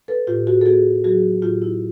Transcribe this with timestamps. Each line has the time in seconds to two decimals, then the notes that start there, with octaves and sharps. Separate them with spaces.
0.08 A4 B4
0.27 A2 F4 G4
0.47 F#4 G#4
0.61 A4
0.66 B3 F#4 G#4
1.04 F#3 F#4 G#4
1.42 A2 F4 G4
1.62 E4